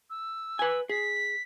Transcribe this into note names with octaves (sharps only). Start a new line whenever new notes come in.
E6
B4 G#5
G#4 B6